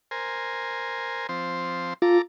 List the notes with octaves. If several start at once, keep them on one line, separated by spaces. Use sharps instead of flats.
A#4 C5 G#5
F3 C4 C5
F4 A4 A#5 D6